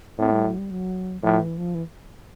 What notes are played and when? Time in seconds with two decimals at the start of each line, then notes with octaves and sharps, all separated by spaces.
0.19 A2 C4
0.32 G3
0.44 F#3
0.58 G3
0.71 F#3
1.22 A2 F3
1.40 E3
1.57 F3
1.75 E3